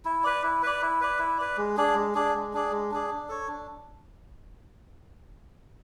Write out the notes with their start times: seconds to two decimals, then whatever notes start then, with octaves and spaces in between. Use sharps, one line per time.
0.05 E4
0.24 B4 D5
0.43 E4
0.63 B4 D5
0.82 E4
1.01 B4 D5
1.19 E4
1.38 B4 D5
1.57 G#3
1.77 D4 G#4 D5
1.95 G#3
2.15 D4 G#4 D5
2.34 G#3
2.53 D4 G#4 D5
2.72 G#3
2.91 D4 G#4 D5
3.10 D4
3.29 A4 C#5
3.48 D4